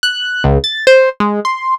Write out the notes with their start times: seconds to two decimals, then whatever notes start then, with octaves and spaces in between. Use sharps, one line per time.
0.03 F#6
0.44 C#2
0.64 A6
0.87 C5
1.20 G#3
1.45 C6